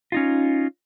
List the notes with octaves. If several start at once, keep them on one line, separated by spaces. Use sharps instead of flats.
C#4 D#4 F4